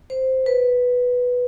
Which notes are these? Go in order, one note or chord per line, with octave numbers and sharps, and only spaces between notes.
C5
B4